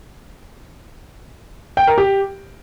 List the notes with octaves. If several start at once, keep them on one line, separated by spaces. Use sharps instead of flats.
G5
A#4
G4